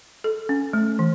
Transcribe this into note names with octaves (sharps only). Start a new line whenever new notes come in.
A4
C#4
A3
E3